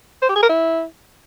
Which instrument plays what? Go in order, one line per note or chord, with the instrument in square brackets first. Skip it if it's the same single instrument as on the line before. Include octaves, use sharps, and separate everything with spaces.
[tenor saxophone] C5
G4
G#4
A#4
E4